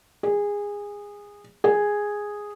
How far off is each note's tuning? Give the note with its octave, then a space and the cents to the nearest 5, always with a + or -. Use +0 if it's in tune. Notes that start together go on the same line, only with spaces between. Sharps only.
G#4 -20
G#4 -5